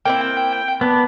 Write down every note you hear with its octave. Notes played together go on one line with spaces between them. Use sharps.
A#3 C4 E4 G5
B3 D4